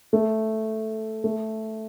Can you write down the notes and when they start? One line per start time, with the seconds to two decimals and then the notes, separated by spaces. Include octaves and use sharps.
0.13 A3
1.24 A3